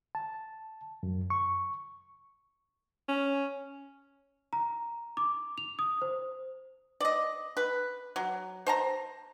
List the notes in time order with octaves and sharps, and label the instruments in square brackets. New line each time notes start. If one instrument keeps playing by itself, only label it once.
[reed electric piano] A5
F#2
C#6
[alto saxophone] C#4
[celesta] A#5
D6
F7
D#6
C5
[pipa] D5 D#5
B4
F#3
C5 A5 A#5